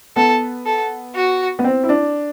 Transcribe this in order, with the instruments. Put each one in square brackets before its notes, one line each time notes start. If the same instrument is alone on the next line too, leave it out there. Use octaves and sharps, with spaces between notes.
[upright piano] B3 [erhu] A4
[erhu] A4
F#4
[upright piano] B3
C4
E4
D4